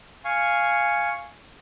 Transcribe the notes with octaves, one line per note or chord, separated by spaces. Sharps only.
F5 G#5 C#6